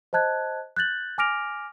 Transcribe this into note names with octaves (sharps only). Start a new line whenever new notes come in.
C5 D#5 A5 F#6 G#6
F#6 G6 A6 F#7
G#5 D6 F6 A#6 D7 F7